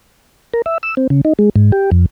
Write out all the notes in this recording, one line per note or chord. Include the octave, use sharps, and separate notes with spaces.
A#4
E5
E6
C4
C#3
D#4
G#3
G#2
G4
F2